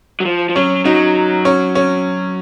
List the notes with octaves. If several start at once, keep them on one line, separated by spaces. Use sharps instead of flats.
F#3
F3
F3
F#3 C#4
F#3 D#4
C#4
C#4